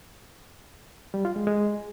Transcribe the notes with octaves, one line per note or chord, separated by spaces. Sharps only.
G3
F4
G#3
G#3